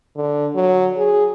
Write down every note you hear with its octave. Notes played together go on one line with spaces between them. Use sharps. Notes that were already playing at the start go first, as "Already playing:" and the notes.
D3
F#3
G#4